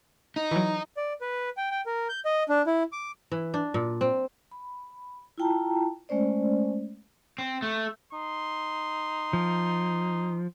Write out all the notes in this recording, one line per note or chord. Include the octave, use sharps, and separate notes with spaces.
D#4
E3 F#3
D5
B4
G5
G5
A#4
G6
D#5
D4
E4
D6
E3
D4
A#2
C4
B5
E4 F4 G5 A5 A#5
G#3 A3 C#4 C5 D5
C4
A3
D#4 C6
F3